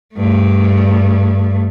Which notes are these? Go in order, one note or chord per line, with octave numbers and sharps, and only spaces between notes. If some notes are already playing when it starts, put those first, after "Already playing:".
G2 A3